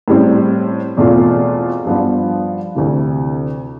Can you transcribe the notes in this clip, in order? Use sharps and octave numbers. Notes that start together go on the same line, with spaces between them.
A2 G3 C4
E2 B2 A3 C4 F4
G2 F3 B3 D4
D2 C3 E3